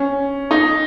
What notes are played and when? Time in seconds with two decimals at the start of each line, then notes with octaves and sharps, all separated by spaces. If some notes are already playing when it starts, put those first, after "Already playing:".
Already playing: C#4
0.51 D#4